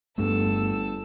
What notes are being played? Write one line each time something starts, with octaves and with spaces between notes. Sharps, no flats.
G1 G2 A3 A4 E6